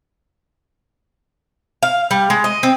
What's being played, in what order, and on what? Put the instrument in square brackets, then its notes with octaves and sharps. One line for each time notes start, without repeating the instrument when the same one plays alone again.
[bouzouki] F5
G3
G#3
D#5
C4